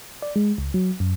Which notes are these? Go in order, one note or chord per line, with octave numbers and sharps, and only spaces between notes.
D5
G#3
C#2
F#3
F#2